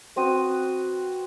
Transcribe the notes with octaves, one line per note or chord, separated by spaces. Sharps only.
B3 C4 F#4 D#6